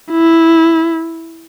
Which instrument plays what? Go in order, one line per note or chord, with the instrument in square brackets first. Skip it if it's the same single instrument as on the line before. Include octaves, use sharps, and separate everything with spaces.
[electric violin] E4